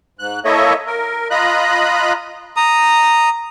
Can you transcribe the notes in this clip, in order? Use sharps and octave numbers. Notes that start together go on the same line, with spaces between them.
G#2 F#6
A#3 E4 A4 C#5 D#5 E5
A#4
F4 D#5 A#5 B5 F#6
A#5 D#6